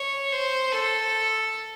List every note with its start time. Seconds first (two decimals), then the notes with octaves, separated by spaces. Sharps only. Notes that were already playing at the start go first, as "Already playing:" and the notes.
Already playing: C#5
0.32 C5
0.71 A4